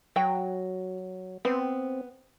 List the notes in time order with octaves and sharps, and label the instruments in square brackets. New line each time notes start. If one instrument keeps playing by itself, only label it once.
[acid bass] F#3 [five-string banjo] F#4 G5
[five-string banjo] B3 [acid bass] C4